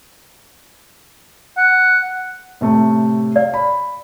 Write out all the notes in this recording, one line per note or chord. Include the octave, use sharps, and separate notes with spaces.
F#5
A2 C3 A3
D5 F5
B5